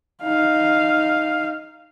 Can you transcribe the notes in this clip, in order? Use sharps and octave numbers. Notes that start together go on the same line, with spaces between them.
D#4 F5